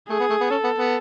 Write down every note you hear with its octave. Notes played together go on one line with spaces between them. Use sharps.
A3 G#4
B3
A3
B3
C#4 A4
B3
B3